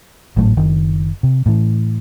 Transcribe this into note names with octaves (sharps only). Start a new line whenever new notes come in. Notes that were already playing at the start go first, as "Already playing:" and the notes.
G#1 A2 F#3 A3
F#1 D#3
C3
A2 E3